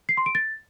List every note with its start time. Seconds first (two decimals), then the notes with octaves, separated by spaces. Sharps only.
0.09 C7
0.17 C6
0.26 D7
0.35 A6